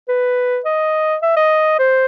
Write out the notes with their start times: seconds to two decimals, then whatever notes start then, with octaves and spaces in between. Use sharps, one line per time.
0.09 B4
0.65 D#5
1.23 E5
1.37 D#5
1.79 C5